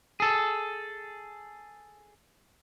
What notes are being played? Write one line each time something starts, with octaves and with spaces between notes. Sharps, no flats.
G#4 A4